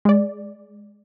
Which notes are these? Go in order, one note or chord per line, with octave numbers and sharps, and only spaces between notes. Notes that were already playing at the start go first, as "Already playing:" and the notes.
G#3 D5